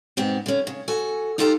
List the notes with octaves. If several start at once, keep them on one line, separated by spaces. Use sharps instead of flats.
G#2 B2 B3 C4
D3 C#4
C#3
F#4 A4 G#5
D#4 F4 G4 A4 F5 A#5